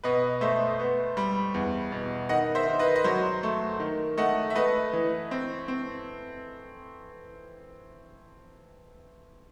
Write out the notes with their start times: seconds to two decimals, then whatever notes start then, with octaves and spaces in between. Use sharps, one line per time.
0.04 B2 B4 D#5
0.41 A3 C5 E5
0.80 B3
1.17 G3
1.54 E2
1.92 B2
2.29 D#3 D#5 F#5
2.55 C5 E5
2.68 D#3
2.79 B4 D#5
2.96 D#5
3.04 F#3 C5
3.43 A3
3.80 D#3
4.17 A3 D#5 F#5
4.50 E5
4.55 A3 B4 D#5
4.93 E3
5.31 C4
5.68 C4